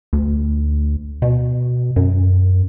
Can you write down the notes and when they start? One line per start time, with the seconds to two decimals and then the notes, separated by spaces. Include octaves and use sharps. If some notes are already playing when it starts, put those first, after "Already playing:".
0.13 D2
1.22 B2
1.96 F#2